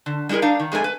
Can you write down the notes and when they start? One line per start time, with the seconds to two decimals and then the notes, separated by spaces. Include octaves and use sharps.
0.06 D3
0.29 G3 G#3 E4 G#4 A#4
0.42 D4 D#4 F5
0.60 D#3
0.72 F2 G#3 A3 D4 G#5
0.84 B4